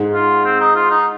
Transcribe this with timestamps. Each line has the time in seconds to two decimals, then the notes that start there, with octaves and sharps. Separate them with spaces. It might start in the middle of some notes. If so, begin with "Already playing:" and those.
Already playing: G#2 G#3
0.14 F4
0.45 C4
0.60 D#4
0.75 F4
0.91 D#4